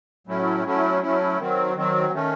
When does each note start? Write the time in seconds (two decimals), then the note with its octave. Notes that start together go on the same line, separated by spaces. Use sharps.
0.27 A2 F#3 A3 C#4 E4
0.64 F#3 A3 C#4 E4
1.02 F#3 A3 C#4 E4
1.38 D#3 F#3 C4
1.74 D#3 F#3 C4
2.12 D#3 A3 C#4